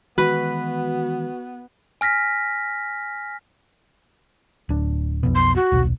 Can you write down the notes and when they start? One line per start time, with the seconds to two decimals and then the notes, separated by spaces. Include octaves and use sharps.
0.18 D#3 E3 G#3 B3 F#4 B4
2.01 G#5 F6 A#6 B6
4.69 D1 D4
5.23 B1 F2 B2
5.35 C6
5.56 F#4
5.72 D#1 B1